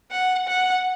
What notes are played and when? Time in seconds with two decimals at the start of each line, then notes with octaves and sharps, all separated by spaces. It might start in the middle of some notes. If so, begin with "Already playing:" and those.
0.11 F#5
0.48 F#5